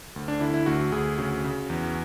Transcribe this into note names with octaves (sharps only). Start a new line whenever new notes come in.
D2
D4
D3 E4
E4
D2 F#4
D2 G#4
C#3 F#4
C#3
E2